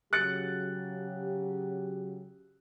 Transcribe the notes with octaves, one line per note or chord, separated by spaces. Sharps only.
C#3 F#3 G4 F#6 A6 C#7